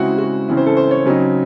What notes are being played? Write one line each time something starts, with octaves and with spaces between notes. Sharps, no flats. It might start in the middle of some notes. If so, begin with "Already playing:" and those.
Already playing: C#3 G#3 C4 E4 F#4
F#4
C#3 E3 C4 E4
C5
A4
C5
C#5
C#3 F#3 C4 D#4